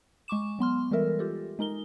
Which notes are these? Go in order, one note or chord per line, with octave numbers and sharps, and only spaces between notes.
G#3 C#6 D6 E7
F#3 B3 C6 F6
E3 G3 G#3 A4 A#4 E5
F4 G4 A4
G#3 D#4 A#4 G7